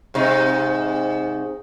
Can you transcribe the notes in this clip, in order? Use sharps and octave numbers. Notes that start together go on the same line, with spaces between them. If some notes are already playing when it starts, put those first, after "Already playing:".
G#2 C3 D#4